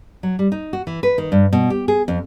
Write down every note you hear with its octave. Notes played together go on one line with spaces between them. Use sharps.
F#3
G3
D#4
F#4
E3
B4
D#3
G2
B2
G4
G#4
F2